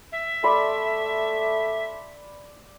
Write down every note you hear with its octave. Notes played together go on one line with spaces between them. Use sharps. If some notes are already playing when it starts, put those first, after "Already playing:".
E5
A3 D5 B5 C6